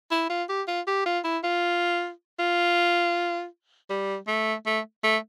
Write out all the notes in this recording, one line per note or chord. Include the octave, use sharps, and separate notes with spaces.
E4
F4
G4
F4
G4
F4
E4
F4
F4
G3
A3
A3
A3